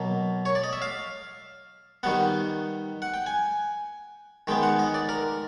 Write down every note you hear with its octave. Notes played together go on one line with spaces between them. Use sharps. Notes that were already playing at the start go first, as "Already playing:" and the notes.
Already playing: B2 F#3 A#3
C#5
D5
D#5
E5
F5
D#3 G3 B3 F#5
F#5
G5
G#5
D#3 G#3 B3 G5
F#5
D#5
D5
A#4